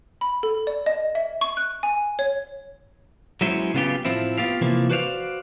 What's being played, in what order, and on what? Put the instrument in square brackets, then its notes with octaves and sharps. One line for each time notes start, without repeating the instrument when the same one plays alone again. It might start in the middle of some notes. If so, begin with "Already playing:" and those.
[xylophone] B5
A4
D5
D#5
E5
C#6
F#6
G#5
C#5
[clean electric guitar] F#3 G#3 B3 C#4 E4 C5
C#3 F#3 B3 F4 G4
A2 F3 C4 E4
B3 F4 G4 F5
C3 E3 F3 A#3
F#4 B4 C5 D5 F5